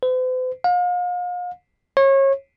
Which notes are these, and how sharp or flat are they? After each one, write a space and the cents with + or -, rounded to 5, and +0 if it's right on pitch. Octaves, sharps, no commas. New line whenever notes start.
C5 -45
F5 +40
C#5 -30